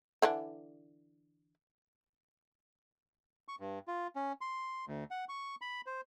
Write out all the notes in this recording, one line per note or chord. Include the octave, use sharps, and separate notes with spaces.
D3 E3 D4
C#6
G2
F4
C#4
C6
D2
F#5
C#6
B5
C5